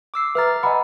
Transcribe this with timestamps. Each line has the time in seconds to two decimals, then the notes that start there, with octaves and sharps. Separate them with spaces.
0.14 D6 E6 C7
0.35 B4 E5 A#5 F6 A6
0.63 D#5 F#5 G#5 A#5 B5